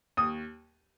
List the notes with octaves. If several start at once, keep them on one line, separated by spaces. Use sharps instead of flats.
D#2 D#6